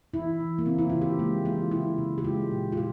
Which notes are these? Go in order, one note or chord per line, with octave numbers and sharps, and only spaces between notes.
E3 E4
E3
A#3
C#3 C4
E4
C#3 F4
G4
G#3 A#3
E3 F4
C#3 E4
C#3
G4
G#3 F4
A#2
F4
C#3 G4